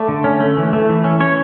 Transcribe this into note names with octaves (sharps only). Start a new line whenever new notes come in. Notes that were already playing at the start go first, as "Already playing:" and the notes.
Already playing: A3 D5
D3
C#4
A3
E3
A3
E3
C#4
C#4 C#5